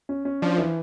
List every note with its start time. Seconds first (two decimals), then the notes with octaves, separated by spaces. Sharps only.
0.09 C#4
0.25 C#4
0.42 F3 D4
0.58 E3